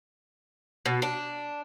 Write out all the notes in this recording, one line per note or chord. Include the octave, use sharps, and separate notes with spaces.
B2
D4